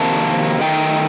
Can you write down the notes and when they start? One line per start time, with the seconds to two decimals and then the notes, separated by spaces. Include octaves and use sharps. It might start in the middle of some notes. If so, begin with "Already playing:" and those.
Already playing: F2 C3 D#3 A#3 A5
0.60 D#3 A3 D#4 G5